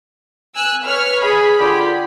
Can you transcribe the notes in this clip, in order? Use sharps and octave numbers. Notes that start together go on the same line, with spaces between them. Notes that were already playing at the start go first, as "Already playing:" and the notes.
G#5 E6 F#6
B4 C#5 F6
G#4 B5
D3 F4 G4